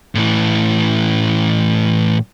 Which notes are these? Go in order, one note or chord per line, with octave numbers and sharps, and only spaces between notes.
A2 E3